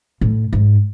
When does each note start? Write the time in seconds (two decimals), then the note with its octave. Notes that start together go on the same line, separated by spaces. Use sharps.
0.21 A2
0.53 G#2